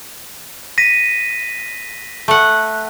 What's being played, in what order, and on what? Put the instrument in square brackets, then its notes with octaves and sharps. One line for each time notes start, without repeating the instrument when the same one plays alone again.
[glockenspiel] A#6 B6 D#7
[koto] A3 F#5